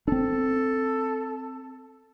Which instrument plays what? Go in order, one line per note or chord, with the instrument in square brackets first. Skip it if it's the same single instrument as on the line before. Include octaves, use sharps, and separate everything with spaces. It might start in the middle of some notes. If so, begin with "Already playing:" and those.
[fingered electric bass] C4 D4 [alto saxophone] A4